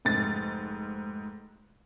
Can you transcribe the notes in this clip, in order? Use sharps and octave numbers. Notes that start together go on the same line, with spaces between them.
F1 G#2 A6